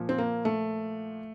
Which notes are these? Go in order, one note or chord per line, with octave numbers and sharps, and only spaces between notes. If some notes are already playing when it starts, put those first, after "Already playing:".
Already playing: A#2 F3
C4
A#3
A3